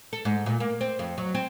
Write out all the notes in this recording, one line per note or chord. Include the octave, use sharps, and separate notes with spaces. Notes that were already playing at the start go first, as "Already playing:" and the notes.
A4
G#2
A#2
A#3
C4
F2
F#3
C4